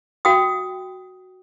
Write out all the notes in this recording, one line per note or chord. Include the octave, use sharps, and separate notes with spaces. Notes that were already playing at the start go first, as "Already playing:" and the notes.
F#4 G5 D#6